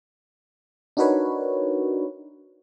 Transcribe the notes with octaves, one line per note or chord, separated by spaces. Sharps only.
D4 D#4 F#4 A#4 B4 C#5